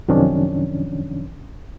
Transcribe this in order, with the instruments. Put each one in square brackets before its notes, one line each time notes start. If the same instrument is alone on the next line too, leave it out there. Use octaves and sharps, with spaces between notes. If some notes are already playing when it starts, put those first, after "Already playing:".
[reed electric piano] F#2 C3 D#3 F3 C#4 D4